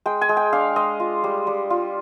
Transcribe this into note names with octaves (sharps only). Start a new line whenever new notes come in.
G#3 G5
G#5
G#3
G5
D4 F5
G#3 D#5
F4
G3
G3
F4